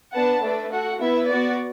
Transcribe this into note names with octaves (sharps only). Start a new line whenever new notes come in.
B3 D4 B4 F#5 A5
A3 D4 B4 D5
F#4 A4 F#5
B3 E4 B4 E5
B3 F#4 D5